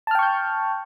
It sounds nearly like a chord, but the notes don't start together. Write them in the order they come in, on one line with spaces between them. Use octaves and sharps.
A5 F6 G5 C#6 G6